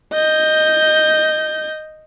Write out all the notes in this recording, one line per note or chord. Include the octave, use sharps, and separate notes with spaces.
D#5 G6